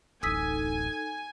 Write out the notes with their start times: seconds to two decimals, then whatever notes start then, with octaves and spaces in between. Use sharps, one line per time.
0.23 D1 A1 D#4 A4 G#5 D#6 E6 B6